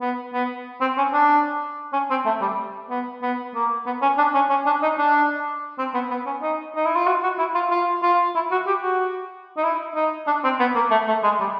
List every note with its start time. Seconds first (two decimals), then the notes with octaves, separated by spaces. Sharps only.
0.01 B3
0.33 B3
0.81 C4
0.98 C#4
1.13 D4
1.93 C#4
2.10 C4
2.25 A3
2.41 G3
2.90 B3
3.22 B3
3.55 A#3
3.86 B3
4.02 C#4
4.18 D4
4.35 C#4
4.50 C#4
4.66 D4
4.82 D#4
4.98 D4
5.78 C4
5.94 B3
6.11 B3
6.26 C#4
6.42 D#4
6.76 D#4
6.85 E4
6.96 F4
7.06 F#4
7.23 F#4
7.39 E4
7.55 F4
7.71 F4
8.02 F4
8.35 E4
8.51 F#4
8.67 G4
8.82 F#4
9.57 D#4
9.64 E4
9.95 D#4
10.27 D4
10.44 C4
10.59 B3
10.75 A#3
10.91 A3
11.08 A3
11.23 G#3
11.40 G3